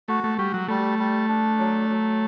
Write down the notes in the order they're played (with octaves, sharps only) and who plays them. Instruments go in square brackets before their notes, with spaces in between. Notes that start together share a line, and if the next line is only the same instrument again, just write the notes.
[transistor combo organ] A3 [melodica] F#4
[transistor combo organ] A3
[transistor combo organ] G3 [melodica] F#4
[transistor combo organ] F#3
[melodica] G3 [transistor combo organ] A3
[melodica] G3
D4
F#3
F#3